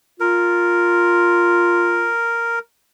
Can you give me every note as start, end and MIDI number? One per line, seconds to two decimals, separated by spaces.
0.20 2.11 65
0.20 2.59 70